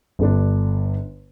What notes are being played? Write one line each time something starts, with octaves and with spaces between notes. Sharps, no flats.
G1 D3 D4